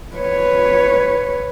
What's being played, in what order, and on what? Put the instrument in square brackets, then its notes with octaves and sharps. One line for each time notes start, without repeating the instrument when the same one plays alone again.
[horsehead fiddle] B4 C#5